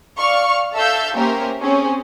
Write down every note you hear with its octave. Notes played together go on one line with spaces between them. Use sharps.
D5 F5 C#6 F6
A4 E5 F5 E6 G6
A#3 C#4 G4 A#4 C5 E5
C4 C#4 G#4